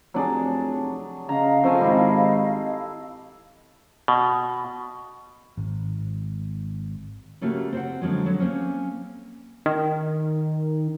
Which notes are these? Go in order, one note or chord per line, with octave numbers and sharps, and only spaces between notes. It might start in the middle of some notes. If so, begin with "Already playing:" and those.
F1 F#3 D4 G#4
C#3 D#5 F5 A#5
F2 F3 A3 G#5
G#1 G3 E4
B2
G#1
C#3 A3 A#3 F#4 G4
C4 C5 F#5
D3 F3 F#3 G#3
D3 F#3
A#3 C4 C#4
D#3